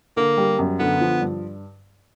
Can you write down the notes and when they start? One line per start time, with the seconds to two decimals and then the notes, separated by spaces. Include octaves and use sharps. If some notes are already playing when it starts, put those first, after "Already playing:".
0.17 D3 A#3
0.37 G3
0.59 F#2
0.79 D3 B3
1.01 F3
1.21 G2